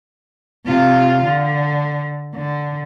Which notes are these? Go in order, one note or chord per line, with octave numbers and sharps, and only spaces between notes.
C3 F4
D3
D3